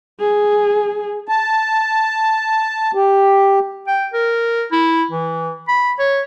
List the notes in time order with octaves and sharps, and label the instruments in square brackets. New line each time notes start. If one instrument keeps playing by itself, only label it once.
[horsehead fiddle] G#4
[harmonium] A5
G4
[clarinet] G5
A#4
E4
E3
B5
C#5